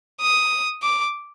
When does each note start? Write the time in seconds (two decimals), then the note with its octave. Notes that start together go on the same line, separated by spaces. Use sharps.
0.21 D#6
0.82 D6